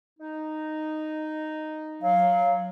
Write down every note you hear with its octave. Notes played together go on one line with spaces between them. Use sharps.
D#4
F#3 F5